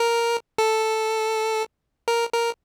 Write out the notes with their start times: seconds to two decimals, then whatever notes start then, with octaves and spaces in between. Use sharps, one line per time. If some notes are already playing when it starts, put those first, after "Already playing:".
Already playing: A#4
0.58 A4
2.08 A#4
2.33 A#4